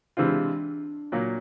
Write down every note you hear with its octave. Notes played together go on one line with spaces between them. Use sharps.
C3 E3 G#3 C4 D4 F4
A#2 F#3 A#3